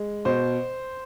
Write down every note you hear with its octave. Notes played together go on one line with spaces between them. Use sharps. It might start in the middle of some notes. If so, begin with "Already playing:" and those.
Already playing: G#3
B2 C5